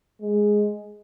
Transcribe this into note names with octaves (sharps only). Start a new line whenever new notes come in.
G#3